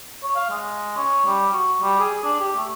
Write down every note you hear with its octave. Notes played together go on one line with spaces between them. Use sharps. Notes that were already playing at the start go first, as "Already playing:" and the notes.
C#5
F5
G#3
C#4
G3
F#4
G3
G#4
D4
G4
A3